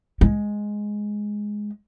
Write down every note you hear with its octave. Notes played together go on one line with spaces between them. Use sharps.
G#3